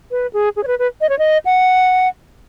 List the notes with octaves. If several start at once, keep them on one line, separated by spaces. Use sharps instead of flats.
B4
G#4
G#4
C#5
B4
B4
D#5
C#5
D#5
F#5